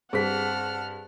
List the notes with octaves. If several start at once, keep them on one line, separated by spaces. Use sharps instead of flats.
G2 C4 G#4 F#5 A5 F6 B6